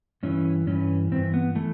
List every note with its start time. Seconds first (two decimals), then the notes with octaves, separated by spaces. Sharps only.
0.23 G2 E3 C#4
0.67 G2 E3 C#4
1.12 G2 E3 C4
1.34 B3
1.55 E3 A3